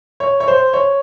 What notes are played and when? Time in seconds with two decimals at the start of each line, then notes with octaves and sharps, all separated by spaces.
0.20 C#5
0.40 C#5
0.48 C5
0.73 C#5